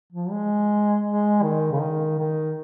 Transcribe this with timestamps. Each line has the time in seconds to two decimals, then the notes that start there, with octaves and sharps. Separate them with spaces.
0.12 F3
0.31 G#3
1.06 G#3
1.43 D#3
1.72 C#3
1.81 D#3
2.18 D#3